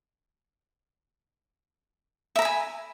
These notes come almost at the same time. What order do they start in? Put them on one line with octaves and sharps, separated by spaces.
E5 A#5 B5 G#5